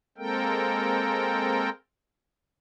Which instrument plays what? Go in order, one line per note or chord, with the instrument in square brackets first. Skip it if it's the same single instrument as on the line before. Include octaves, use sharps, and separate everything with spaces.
[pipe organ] G#3 A#3 C4 A4 A#4 G5